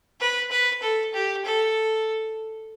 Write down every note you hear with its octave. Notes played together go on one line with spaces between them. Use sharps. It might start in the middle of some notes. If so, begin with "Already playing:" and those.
B4
B4
A4
G4
A4